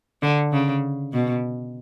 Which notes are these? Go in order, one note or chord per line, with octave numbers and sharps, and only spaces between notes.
D3
C#3
B2